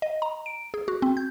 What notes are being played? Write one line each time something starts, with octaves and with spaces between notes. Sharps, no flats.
D#5
A#5
D7
G#4
F#4
C4
G6